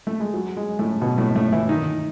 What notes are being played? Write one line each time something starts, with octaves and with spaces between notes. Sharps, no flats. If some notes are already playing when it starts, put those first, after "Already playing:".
A3
G#3
F#3
G#3
A2 A3
B2 B3
A2 A3
A2 A3
E3 E4
D#3 D#4